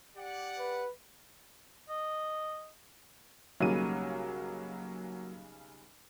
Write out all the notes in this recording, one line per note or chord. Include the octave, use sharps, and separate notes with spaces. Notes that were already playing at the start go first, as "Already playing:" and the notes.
G4 D5 F#5
B4
D#5
B1 C#3 F#3 G3 A#3 D#7